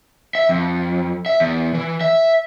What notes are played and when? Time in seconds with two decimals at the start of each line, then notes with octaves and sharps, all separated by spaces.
0.35 E5
0.49 F2
1.26 E5
1.40 E2
1.75 E3
2.01 E5